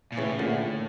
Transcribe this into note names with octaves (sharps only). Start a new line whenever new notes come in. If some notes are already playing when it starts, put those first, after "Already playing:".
A#2
A2 C#3 E3
A#2 D3